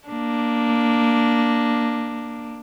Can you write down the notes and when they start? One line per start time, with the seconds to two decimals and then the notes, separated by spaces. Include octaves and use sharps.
0.10 A#3 D4